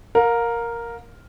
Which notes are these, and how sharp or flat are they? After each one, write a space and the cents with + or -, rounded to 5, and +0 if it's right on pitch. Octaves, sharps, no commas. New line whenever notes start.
A#4 +0 F5 +35